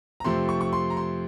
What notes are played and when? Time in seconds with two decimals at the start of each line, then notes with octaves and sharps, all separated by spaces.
0.20 A#5
0.24 F2 C3 F3 A3 C4 C6
0.49 C#6
0.61 C#6
0.73 C6
0.90 A#5
0.97 C6